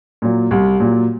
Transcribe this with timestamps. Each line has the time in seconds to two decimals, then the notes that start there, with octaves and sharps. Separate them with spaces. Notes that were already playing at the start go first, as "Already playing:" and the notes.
0.22 A#2 F#3
0.51 C2
0.80 A#2 F#3